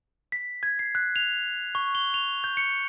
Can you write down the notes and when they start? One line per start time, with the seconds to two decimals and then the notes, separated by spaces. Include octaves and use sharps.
0.32 B6
0.63 G#6
0.79 C7
0.95 F#6
1.16 F7
1.75 C#6
1.95 G7
2.14 F7
2.44 G6
2.57 C#7